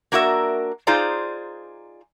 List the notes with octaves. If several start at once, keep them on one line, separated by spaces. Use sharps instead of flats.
A#3 D4 F#4 A#4 E5
D#4 F4 G#4 C5 D5 A#5